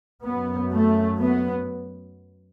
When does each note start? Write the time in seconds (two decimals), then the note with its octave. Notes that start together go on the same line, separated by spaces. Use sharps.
0.25 F#2 B3
0.72 A3
1.19 B3